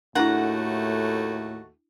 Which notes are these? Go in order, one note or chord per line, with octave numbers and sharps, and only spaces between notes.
D#2 A2 A3 D4 E4 F#4 F#5 A#5